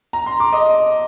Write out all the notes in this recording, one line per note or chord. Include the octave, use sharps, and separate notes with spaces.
A#5
C6
D6
D#5